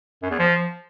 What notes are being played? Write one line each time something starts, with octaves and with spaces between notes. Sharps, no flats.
F#2
E2
F3